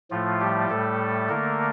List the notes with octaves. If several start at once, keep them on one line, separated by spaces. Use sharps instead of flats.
A2 F3 A3 F4
G3 G4
A2 G3 A3 A4
D3 A3 A#3 A#4